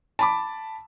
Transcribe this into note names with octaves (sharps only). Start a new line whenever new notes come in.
A5 B5 D6